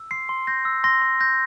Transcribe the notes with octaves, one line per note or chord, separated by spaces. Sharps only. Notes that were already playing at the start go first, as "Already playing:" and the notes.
Already playing: E6
C6 C7
C6
G6 A#6
E6
C6 A#6
C6
G6 A#6